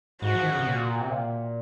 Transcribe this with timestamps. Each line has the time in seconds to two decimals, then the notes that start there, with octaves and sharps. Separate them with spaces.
0.22 G#2 F#4
0.35 F3
0.42 D#3
0.50 C#3
0.59 C3
0.67 A#2
1.01 C3
1.10 A#2